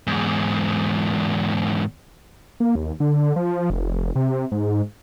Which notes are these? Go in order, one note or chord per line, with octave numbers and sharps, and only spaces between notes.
E2 G#2
A#3
D#2
D3
F3
F1
C3
G#2